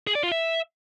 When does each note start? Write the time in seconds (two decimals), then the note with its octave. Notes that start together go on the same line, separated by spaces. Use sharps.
0.07 G#4
0.15 D5
0.23 F4
0.32 E5